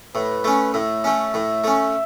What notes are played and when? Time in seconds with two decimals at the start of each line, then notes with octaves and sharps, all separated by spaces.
0.15 A2 B4
0.44 A3 C#4
0.74 A2 E5
1.04 A3 C#4
1.34 A2
1.64 A3 C#4